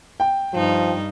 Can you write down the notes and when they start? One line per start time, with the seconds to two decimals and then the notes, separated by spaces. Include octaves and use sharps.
0.20 G5
0.54 G2 F3 D#4